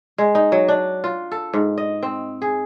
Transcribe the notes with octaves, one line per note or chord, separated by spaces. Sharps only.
G#3
D#4
F#3
D4
F4
A4
G#2
D#5
C4
G#4